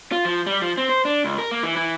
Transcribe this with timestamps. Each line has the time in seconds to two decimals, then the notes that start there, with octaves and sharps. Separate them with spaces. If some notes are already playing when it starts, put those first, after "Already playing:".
0.12 F4
0.25 F3
0.46 G3
0.62 F3
0.78 C4
0.89 C5
1.05 D4
1.25 C#2
1.38 A#4
1.51 A#3
1.63 E3
1.77 E3